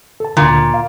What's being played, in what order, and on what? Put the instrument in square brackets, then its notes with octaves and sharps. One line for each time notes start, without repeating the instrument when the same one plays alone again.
[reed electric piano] A4 A5
[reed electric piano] D2 D3 [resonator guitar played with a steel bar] A#2
[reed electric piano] F5